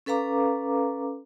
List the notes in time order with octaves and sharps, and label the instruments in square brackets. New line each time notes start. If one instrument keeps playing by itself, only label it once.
[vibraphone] C#4 A4 B4 F5 A#5 D6